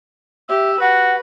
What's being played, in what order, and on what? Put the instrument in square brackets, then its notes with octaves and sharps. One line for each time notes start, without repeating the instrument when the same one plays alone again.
[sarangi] G4 [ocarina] E5 [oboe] E6
[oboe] F#4 [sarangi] B4 [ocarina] F#5